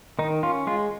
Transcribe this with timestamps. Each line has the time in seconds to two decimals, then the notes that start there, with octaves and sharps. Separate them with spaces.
0.19 D#3 D#4
0.43 C#4 F4
0.67 G#3 F4